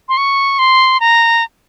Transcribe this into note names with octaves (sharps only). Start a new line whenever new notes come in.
C6
C#6
C6
A#5